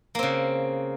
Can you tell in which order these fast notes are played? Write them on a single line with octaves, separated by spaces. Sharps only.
A#3 C4 C#3